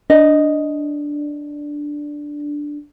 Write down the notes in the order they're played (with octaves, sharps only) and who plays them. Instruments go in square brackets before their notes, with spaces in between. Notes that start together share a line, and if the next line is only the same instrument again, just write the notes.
[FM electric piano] D4 [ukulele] D#5